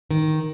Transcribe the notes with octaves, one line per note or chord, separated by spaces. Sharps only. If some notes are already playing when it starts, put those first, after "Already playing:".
D#3